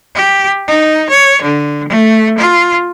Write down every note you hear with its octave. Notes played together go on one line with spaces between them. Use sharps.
G4
D#4
C#5
D3
A3
F4